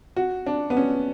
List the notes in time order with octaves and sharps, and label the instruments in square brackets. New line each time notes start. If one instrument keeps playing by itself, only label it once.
[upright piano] F#4
D4
B3
C#4